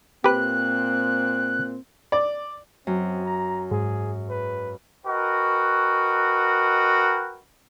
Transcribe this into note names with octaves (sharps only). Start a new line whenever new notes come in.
A#2 C4 G4 B4 F#6
D5
F#2 C4
A#5
G#2 G#4
B4
F#4 A#4 B4 D#5 G5